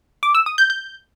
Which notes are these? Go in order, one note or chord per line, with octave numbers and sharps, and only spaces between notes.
D6
E6
D#6
G6
G6